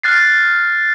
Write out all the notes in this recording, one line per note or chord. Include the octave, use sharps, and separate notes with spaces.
F6 F#6 A6 C7